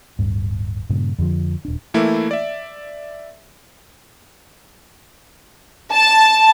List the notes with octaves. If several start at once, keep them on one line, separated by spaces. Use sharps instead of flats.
D1 G2
G2 A#2 C#3
F2 D3 E3 F3
D#1 D4
E3 A3 A#3 E4
D5 E5
A5